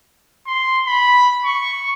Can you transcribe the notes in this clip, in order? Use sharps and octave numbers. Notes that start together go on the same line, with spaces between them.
C6
B5
C#6